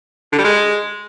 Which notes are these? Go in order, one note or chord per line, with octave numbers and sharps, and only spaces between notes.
D3
G3
G#3